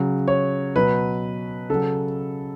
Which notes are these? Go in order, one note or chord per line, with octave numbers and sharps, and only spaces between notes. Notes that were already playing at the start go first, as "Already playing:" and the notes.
Already playing: C#3 F#3
C#5
B2 F#3 B4
C#3 F#3 A4